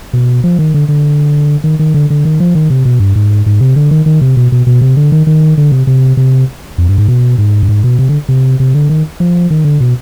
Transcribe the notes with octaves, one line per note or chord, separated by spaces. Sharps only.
B2
F3
D#3
D3
D3
D#3
D#3
D3
D3
D#3
F3
D#3
C3
B2
G2
G#2
G#2
C3
D3
D#3
D#3
C3
B2
B2
B2
C3
D3
D#3
D#3
D3
C3
C3
C3
F2
G2
G#2
B2
G#2
G2
G#2
B2
C3
D3
C3
C3
D3
D#3
F3
D#3
D3
B2